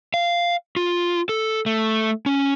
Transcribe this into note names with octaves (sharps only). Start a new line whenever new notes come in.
F5
F4
A4
A3
C#4